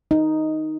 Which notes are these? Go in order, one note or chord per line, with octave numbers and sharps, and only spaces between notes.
D#4